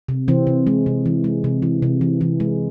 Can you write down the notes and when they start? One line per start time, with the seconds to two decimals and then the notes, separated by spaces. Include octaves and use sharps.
0.09 C3
0.28 C3 E3 C4
0.47 C3
0.67 G#3
0.86 C3
1.06 E3
1.24 G#3
1.44 C3
1.62 E3
1.82 C3
2.01 E3
2.21 E3
2.40 G#3